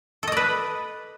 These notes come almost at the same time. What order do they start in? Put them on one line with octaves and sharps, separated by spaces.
A4 D#5 D5 B4